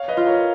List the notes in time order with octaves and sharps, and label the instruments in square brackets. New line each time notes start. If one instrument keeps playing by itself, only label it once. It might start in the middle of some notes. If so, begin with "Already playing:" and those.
Already playing: [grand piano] C#5 F5
B4 D#5
[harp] F4
[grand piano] A#4 C#5